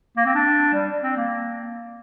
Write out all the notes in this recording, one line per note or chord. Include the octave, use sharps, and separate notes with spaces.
A#3
C4
D4
G3
C4
A#3